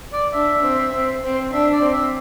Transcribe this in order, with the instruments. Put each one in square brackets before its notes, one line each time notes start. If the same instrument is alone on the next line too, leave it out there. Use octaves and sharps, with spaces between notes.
[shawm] D5
[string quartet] D4 [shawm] E5
[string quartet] C4
C4
C4
[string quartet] D4 [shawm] E5
[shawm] D5
[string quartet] C4
[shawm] E5